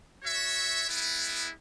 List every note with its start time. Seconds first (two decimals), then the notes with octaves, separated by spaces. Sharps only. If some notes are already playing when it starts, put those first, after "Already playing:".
0.22 F#4 C#5 E5
0.86 G#3 B3 E4